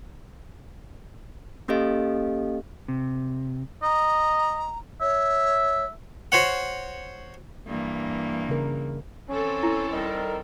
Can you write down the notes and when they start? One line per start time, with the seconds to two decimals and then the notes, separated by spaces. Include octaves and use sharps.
1.68 A#3 C#4 G4 A4 D#5 F5
2.88 C3
3.83 D#5 A#5
5.01 C#5 E5
6.32 F#4 C5 C#5 F#5
7.67 G2 E3 A#3
8.49 C#3 A#4
9.29 E3 C4 C#4 A4
9.63 E4
9.92 D#3 G3 A#4